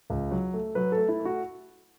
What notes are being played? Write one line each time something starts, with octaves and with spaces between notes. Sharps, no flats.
C#2
F#3
A3
F#3 B4
A4
A3
E4
A3
F#4